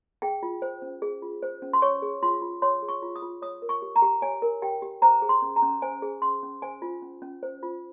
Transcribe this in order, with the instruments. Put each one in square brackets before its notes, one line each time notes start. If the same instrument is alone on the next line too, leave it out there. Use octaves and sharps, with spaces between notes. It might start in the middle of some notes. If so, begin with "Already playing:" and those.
[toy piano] G#4 G5
F4
C5
C#4
G#4
F4
C5
C#4
C6
C#5 C#6
G#4
F4 C6
F4
C#5 C6
G#4
C#6
F4
D#6
F4
C#5 D#6
A#4
C#6
G4
A#5
G4
C#5 G#5
A#4
G4 G5
G4
C5 A#5
G#4
C6
C#4
A#5
C#4
C5 G#5
G#4
C#4 C6
C#4
C5 G#5
F4
C#4
C#4
C5
F4